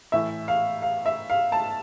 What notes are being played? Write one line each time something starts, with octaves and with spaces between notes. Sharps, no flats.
A2 E3 E5
F5
F5
E5
F5
A5